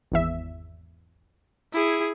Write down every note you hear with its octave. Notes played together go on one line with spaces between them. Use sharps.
G#1 E2 E5
E4 G#4